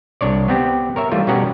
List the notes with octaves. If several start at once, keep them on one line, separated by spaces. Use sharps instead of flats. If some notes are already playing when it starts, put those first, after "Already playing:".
C2 D4 C#5 D5
B3 C4 G4
A#4 C#5 E5
E3 G3 A3 F4
B2 G3 C#4 G4 F#5 A#5